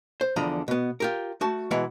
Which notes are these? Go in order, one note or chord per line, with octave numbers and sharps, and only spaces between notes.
C5
E2 D3 F3 D#5 A#5 B5
B2 B3
F4 G4 A#4
A3 F#4 A5
B2 E3 G#3 E4 F#5 A#5